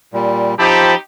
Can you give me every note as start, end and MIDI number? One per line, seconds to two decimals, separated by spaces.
0.14 0.54 46
0.14 0.54 55
0.59 0.95 53
0.59 0.94 60
0.59 0.94 63
0.59 0.94 67
0.59 0.95 81
0.59 0.95 83